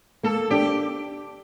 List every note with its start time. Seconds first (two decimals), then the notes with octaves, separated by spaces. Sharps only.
0.23 A#3 A4
0.50 D4 G4